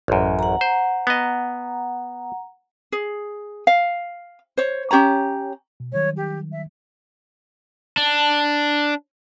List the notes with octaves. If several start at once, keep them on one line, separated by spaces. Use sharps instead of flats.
A1 F#2
F#5 A#5
C5
B3 D#5
G#4
F5
C5 C#5
C#4 G4 C#5 A#5
B2
D#3 F#3 G3 C#5
G4
E5
D4